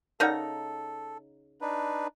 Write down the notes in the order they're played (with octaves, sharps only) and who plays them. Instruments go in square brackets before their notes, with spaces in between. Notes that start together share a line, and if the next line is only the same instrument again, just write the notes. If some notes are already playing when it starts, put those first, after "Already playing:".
[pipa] C#3 D#4 A#5 [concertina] A4 [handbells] A#4 D5 F#5
[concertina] D4 D#4 B4